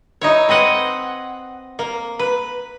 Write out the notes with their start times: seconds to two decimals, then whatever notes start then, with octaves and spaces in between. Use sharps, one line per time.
0.21 D#4 E4 C#5
0.49 C4 B4 D#5 F#5
1.79 A#3
2.19 B4